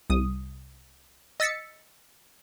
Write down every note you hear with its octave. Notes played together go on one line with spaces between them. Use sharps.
C2 D#6
D#5 E6 A6 B6 C#7